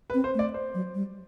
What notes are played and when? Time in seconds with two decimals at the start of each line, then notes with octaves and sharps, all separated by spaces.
0.10 B4
0.14 C4
0.24 C5
0.34 A3
0.39 D5
0.54 C5
0.74 F#3
0.95 G3